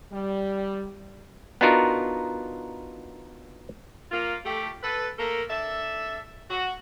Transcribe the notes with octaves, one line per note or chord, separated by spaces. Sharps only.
G3
B3 D4 D#4 F4 F#4 A#4
A#3 F4
A3 G4
A4 B4
A3 A#3 A4 A#4
D4 A4 E5
F#4